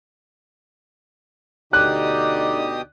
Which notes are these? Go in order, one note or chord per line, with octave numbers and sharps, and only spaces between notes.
D2 B2 D3 D#4 G4 D5 D#6 F#6